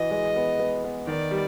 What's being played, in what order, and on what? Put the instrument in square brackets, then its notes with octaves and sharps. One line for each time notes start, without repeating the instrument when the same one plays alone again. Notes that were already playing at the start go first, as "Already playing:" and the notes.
Already playing: [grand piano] E3 F#4 [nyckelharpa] D#5
[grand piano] G#3
B3
B3
B3
[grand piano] D#3 [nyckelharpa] D5
[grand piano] G3